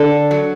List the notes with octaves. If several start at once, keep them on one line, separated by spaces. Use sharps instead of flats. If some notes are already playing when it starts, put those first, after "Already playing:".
Already playing: D3 A4
F#3